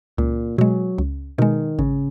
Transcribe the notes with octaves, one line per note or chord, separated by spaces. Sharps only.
C#2 A#2
B2 F#3 G#3
C#2
B2 D#3 G#3
G#1 C#3